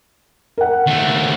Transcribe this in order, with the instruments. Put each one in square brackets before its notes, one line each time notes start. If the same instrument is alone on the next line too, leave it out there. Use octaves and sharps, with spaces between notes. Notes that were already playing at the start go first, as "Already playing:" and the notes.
[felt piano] A#4 F#5
[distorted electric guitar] D#2 A3